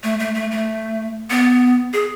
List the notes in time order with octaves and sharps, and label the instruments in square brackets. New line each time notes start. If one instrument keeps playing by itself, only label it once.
[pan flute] A3
A3
A3
A3
B3
G#4